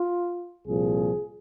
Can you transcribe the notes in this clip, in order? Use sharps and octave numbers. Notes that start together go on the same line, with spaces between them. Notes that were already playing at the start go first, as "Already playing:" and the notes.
Already playing: F4
C2 A#2 F3 G#4